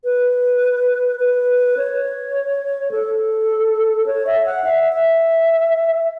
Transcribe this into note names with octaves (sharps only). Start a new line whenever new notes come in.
B4
B4
C#5
A4
C#5
E5
F#5
E5
E5